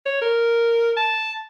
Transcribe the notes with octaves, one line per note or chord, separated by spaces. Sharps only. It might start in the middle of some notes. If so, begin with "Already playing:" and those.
C#5
A#4
A5